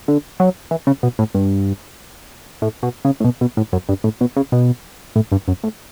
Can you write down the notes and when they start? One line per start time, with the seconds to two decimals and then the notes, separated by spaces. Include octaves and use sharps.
0.08 D3
0.40 F#3
0.71 E3
0.87 C#3
1.03 B2
1.19 A2
1.35 G2
2.62 A2
2.83 B2
3.05 C#3
3.20 A2
3.25 B2
3.41 B2
3.57 A2
3.73 F#2
3.89 G2
4.04 A2
4.21 B2
4.37 C#3
4.52 B2
5.16 A2
5.32 G2
5.48 F#2
5.63 A2